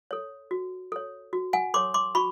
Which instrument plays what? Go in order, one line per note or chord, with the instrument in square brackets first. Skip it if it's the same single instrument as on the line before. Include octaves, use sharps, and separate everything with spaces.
[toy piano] A4 C#5
F#4
A4 C#5
F#4
F#5 G#5
A4 C#5 C6 D6
C6 D6
F#4 B5 C#6